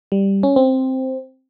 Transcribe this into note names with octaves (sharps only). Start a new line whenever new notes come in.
G3
C#4
C4